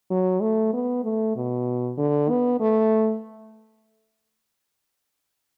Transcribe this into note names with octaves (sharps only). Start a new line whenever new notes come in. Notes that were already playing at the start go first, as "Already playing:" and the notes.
F#3
A3
B3
A3
B2
D3
B3
A3